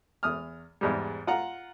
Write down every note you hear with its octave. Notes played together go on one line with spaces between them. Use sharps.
E2 D#6 F6
E2 G#2 G3
F4 F#5 A#5